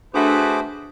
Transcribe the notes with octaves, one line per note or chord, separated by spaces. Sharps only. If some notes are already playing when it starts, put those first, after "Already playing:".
A3 D4 F#4 G#4 B4 C5 F#5 D6